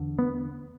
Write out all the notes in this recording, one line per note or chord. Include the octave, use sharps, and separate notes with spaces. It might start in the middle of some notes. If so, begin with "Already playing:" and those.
Already playing: E2 D3
B3